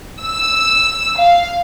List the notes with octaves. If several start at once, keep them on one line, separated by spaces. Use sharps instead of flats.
E6
F5